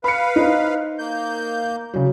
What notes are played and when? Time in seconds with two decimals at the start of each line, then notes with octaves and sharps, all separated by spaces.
0.04 B4 F5 B5 C#7
0.36 D#4 C5
0.99 A#3 G6
1.94 C#3 F#3